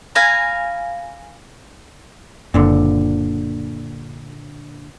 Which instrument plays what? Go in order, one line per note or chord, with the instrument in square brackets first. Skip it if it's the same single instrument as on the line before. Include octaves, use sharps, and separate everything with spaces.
[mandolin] F5 G#5 A#5 B5
[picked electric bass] F#1 [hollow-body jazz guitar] A#2 D3